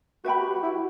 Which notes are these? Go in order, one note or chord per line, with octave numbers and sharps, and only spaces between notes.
F#4 B4 E5 G5 B5
G4
F#4
E4
F#4